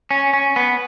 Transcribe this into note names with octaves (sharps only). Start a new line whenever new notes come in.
C#4
C#4
B3